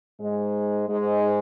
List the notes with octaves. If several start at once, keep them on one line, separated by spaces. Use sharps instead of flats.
G#2 G#3
G#2 G#3